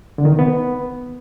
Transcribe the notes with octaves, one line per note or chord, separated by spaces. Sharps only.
D3
D#3
C3
B3